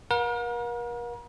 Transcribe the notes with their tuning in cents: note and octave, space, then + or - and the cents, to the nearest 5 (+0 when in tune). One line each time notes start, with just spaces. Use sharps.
A#4 +40 F#5 -45